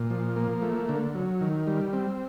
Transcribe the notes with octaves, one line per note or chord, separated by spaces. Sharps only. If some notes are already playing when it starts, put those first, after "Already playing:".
Already playing: A#2
F3
A#3
A3
D3
F#3
D#3
G3
C4